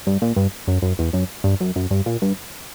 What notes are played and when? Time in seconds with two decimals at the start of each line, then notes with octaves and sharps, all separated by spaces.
0.07 G2
0.22 A#2
0.36 G2
0.68 F#2
0.82 F#2
0.99 E2
1.13 F#2
1.44 G2
1.60 F#2
1.76 F#2
1.90 G2
2.06 A#2
2.22 G2